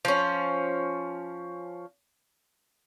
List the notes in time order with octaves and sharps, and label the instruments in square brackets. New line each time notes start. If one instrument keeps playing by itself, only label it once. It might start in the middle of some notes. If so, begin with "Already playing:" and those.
[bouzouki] F3 C#4